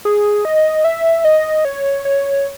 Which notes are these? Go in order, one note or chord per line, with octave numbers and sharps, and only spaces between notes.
G#4
D#5
E5
D#5
C#5
C#5